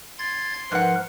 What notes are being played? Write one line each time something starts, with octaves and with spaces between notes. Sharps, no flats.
C6 G#6 A6
G#2 F3 A#4 B4 F#5